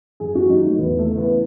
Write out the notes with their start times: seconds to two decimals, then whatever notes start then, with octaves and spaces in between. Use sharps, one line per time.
0.20 F#2 G#4
0.35 F#4
0.49 D#3 F#3 D#4
0.64 A3
0.78 E2 B3
0.99 A3
1.08 C#3 E3
1.18 B3